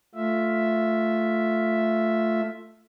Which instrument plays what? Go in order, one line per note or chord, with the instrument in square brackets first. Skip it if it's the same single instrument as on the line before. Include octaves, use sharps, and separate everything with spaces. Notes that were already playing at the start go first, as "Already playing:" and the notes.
[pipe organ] A3 F4 E5